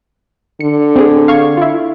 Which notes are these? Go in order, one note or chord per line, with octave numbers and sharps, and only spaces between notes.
D3 C#7
C4 G#4
F5 C#6 G#6
E4 F4